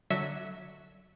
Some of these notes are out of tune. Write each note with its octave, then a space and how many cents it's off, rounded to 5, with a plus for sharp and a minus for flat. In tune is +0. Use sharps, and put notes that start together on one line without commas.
D3 +0 F#3 +0 E5 -15